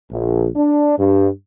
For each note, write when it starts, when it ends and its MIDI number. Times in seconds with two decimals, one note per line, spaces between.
0.11 0.48 34
0.56 0.96 62
0.98 1.28 43